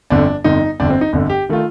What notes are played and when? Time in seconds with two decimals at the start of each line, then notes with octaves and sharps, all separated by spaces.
0.10 G1 F2 D3 D4
0.44 G1 F2 D3 D#4
0.80 G1 F2 D3 D4
0.90 C4
1.01 D#4
1.13 G1 F2 D3
1.29 G4
1.49 D#3 A3 F4